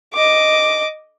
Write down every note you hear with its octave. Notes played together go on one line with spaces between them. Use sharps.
D#5 D6